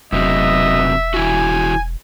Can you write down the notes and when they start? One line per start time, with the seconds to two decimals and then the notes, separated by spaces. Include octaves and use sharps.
0.12 E1 F#2 C3 F#3 B3 D#5 E5
1.14 D#3 E4 F#4 G#5